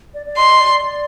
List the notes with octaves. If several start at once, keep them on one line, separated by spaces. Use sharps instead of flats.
D5
D5
D#5 C6
D5
D5